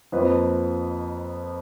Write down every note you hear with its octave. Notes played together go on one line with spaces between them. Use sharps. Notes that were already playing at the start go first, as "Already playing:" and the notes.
F2 F3 A#3 B4 D#5